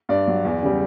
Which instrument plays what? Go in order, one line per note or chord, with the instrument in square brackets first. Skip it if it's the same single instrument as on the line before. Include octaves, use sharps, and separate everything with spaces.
[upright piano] G2 D5
F#3
E2
C#3 G3